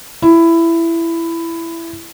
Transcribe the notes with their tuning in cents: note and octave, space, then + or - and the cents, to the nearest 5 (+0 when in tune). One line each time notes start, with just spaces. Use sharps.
E4 +15